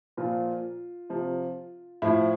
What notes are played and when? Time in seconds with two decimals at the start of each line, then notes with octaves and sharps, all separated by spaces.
0.17 A#2 F3 F4
1.10 C3 F3
2.02 A2 F3 E4